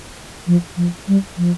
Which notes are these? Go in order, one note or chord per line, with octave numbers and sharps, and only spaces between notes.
F3
F3
G3
F3